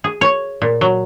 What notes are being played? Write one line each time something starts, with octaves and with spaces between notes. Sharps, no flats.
G#4
C#5
A#2
F#3